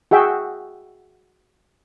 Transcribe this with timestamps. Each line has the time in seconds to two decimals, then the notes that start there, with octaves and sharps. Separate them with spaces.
0.11 F#4 G#4 E5 G5